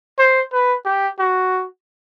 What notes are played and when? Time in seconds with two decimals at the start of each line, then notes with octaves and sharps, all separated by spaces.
0.19 C5
0.53 B4
0.85 G4
1.19 F#4